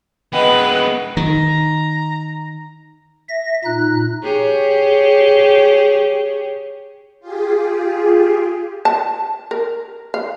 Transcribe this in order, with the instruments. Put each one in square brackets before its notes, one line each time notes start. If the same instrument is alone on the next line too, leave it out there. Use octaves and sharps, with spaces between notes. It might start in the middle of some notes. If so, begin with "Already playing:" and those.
[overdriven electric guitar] G#3 B3 [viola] B4 [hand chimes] D#5 F#5 G5
[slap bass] D#3 [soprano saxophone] A#5
[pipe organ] E5 A#6
A#2 D#4 F#6
[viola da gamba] G4 G#4 C#5
[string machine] F4 G4 G#4
[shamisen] A5
A#4
F5